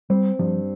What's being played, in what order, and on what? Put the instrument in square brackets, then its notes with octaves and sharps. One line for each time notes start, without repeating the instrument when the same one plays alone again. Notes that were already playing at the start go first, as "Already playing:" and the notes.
[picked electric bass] G3 [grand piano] C4
[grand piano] G2 [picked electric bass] F3